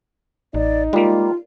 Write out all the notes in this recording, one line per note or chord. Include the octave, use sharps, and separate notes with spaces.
A1 D#4 D5
G3 G#3 A#3 F4